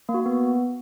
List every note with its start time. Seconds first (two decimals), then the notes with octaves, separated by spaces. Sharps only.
0.09 A#3
0.14 F#4
0.20 A#3
0.26 B3